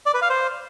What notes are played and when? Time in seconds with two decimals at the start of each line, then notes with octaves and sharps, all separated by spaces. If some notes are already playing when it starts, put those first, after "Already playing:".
0.06 D5
0.14 B4
0.22 F5
0.30 C5